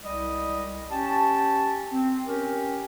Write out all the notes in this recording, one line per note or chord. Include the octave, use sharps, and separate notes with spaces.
C2 G3 G#3 D#5
C#4 G4 A5
C4
C#4 G4 A#4